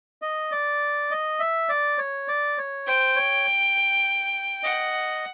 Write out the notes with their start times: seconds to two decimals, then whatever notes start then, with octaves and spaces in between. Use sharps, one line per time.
0.22 D#5
0.51 D5
1.11 D#5
1.40 E5
1.69 D5
1.98 C#5
2.28 D5
2.58 C#5
2.87 C5 G5
3.16 C#5
4.63 D#5 F#5